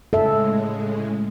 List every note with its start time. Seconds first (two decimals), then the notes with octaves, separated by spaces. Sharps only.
0.13 A2 C#3 G#3 A4 E5